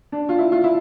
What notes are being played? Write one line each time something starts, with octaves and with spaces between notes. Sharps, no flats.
D4
F4
E4
F4
E4